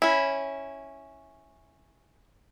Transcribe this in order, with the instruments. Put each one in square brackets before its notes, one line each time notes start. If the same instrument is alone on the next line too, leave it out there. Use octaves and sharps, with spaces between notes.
[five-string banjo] C#4 E4